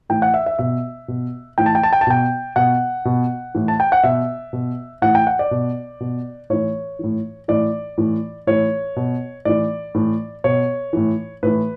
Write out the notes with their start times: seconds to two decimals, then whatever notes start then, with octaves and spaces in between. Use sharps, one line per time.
0.09 A2 E3 G5
0.22 F#5
0.34 E5
0.46 E5
0.59 B2 E5
1.08 B2
1.58 A2 E3 G5
1.66 A5
1.75 G5
1.83 A5
1.93 G5
2.01 A5
2.07 B2 G5
2.56 B2 F#5
3.05 B2
3.55 A2 E3
3.68 A5
3.80 G5
3.92 F#5
4.03 B2 E5
4.53 B2
5.02 A2 E3 F#5
5.15 G5
5.27 F#5
5.39 D5
5.51 B2
6.00 B2
6.50 A2 E3 C#5
6.99 A2 E3
7.48 A2 E3 D5
7.97 A2 E3
8.47 A2 E3 C#5
8.96 B2
9.45 A2 E3 D5
9.95 A2 E3
10.44 B2 C#5
10.93 A2 E3
11.43 A2 E3 B4